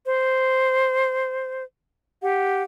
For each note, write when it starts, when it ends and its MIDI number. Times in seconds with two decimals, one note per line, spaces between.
0.05 1.63 72
2.22 2.63 67
2.22 2.63 78